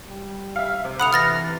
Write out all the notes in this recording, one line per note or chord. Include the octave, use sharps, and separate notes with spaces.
G3
E5 F5
C3
D3 F#5 B5 D#6 F7
E3 F6 A6 A#6